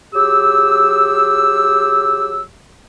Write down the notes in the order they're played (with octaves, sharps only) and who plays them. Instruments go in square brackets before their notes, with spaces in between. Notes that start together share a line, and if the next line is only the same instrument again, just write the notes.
[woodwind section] F#3 G4 G#4 E6